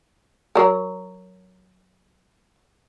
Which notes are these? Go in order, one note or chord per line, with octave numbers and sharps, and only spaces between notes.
F#3 A#4